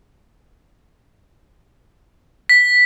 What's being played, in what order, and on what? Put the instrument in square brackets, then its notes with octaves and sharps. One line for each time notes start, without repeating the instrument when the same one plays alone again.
[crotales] B6